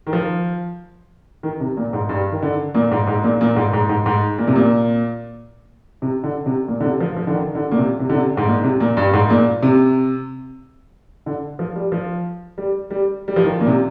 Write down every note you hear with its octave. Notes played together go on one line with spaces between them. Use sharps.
D#3
F3
D#3
C3
A#2
G#2
G2
D#3
D3
A#2
G#2
G#2
A#2
A#2
G#2
G#2
G#2
G#2
A#2
C3
A#2
C3
D3
C3
A#2
D3
C3
F3
F3
D3
D#3
D3
A#2
C3
C3
D3
C3
G#2
A#2
C3
A#2
G2
G#2
A#2
C3
D3
F3
G3
F3
G3
G3
G3
F3
D#3
A#2
C3